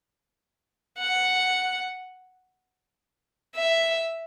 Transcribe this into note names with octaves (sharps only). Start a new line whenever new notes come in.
F#5
E5